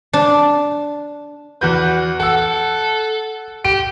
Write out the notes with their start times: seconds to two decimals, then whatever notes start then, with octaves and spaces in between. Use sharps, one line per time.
0.13 D4
1.61 E2 F#4 B4 G6
2.20 A4 F#5 E6
3.65 G4 D7